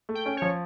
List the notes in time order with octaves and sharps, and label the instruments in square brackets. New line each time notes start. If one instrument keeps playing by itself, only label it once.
[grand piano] A3
[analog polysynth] G5
[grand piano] C#4
[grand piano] F3 [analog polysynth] C#5